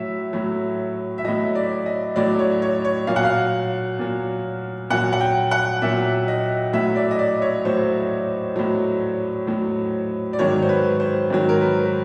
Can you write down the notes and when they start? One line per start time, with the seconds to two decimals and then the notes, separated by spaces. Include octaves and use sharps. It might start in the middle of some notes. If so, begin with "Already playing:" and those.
Already playing: A2 F#3 E5
0.33 A2 F#3
1.18 E5
1.25 A2 F#3 D#5
1.55 D5
1.86 D#5
2.16 A2 F#3 D5
2.39 C#5
2.62 C#5
2.85 C#5
3.07 A#2 F#3 F5
3.16 F#5
3.25 F5
3.99 A#2 F#3
4.90 A#2 F#3 F#5
5.13 F#5
5.21 G5
5.51 F#5
5.82 A#2 F#3 E5
6.28 D#5
6.73 A2 F#3 E5
6.96 D5
7.11 D#5
7.19 D5
7.42 C#5
7.65 A2 F#3 C5
8.56 A2 F#3
9.47 A2 F#3
10.33 D5
10.39 G#2 D#3 F#3 C#5
10.62 C5
10.69 B4
11.00 C5
11.30 G#2 D#3 F#3
11.49 A#4
11.61 B4
11.85 B4